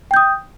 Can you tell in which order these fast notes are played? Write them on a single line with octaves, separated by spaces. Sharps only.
G5 G6 D#6